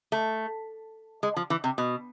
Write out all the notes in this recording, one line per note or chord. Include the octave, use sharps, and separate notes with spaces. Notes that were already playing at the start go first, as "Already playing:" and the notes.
A3
G#3
F3
E3
C3
B2